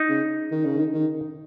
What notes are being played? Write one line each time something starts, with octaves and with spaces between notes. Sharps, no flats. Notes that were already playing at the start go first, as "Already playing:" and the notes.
Already playing: D#4
C#3
D#3
C#3
D#3
D#3